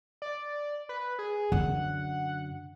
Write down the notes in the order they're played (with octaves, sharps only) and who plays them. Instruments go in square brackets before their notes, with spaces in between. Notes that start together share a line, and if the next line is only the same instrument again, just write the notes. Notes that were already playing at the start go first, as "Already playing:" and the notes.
[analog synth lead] D5
B4
G#4
[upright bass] F#2 D3 [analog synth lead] F#5